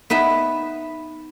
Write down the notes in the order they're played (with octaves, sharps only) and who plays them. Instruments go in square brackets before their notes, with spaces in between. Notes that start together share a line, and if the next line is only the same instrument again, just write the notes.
[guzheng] B3 D#4 B4 E5